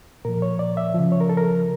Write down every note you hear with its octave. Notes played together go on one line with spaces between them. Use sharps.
A#2 F3 A#4
C#5
D5
E5
C#3 F3
C#5
A#4
A4
A#4